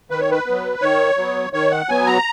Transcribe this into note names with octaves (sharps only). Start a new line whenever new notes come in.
D#3 B4
C#5
B4
F#3 B3
D#3 C#5
F#3 B3
D#3 C#5
F#5
F#3 B3 G#5
A#5